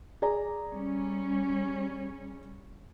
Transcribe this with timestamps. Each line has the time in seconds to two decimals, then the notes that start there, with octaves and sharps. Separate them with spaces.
0.22 G#4 D5 A#5
0.70 G3 C#4